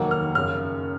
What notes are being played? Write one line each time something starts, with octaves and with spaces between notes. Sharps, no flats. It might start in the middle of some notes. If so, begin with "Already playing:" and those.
Already playing: F1 D#2 D#3 F#3 A#3 F#5
F6
F#1 F#2 C#3 F6